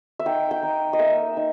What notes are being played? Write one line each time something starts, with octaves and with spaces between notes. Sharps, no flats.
E5
D#4 G5
G5
D#4
D#5
A#3 E5
D#4